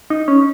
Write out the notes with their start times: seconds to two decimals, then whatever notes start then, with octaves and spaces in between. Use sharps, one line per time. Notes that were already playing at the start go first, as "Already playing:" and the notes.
0.10 D#4
0.28 C#4